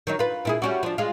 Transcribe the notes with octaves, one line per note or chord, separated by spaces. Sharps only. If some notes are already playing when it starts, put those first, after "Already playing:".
D#3 F#3 D#4
F4 B4
A#2 E4 G#4
G3 C#4 F#4
F3 D4
G#3 F4